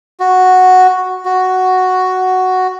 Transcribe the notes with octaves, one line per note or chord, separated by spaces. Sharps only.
F#4
F#4